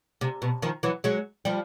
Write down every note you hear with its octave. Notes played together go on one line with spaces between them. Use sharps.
C3
B2
D#3 F3
E3 F#3
F#3 G#3
F3 G3